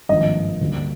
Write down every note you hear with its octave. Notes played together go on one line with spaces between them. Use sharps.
G#1 G2 F3 A#3 D#5
D2 D3 G3 A#3